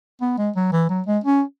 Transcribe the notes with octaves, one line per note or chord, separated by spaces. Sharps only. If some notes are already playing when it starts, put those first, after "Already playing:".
B3
G#3
F#3
E3
F#3
G#3
C#4